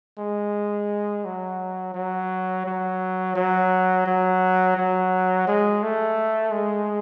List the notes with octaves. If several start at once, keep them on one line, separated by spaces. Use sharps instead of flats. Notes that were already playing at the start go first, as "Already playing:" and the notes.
G#3
F#3
F#3
F#3
F#3
F#3
F#3
G#3
A3
G#3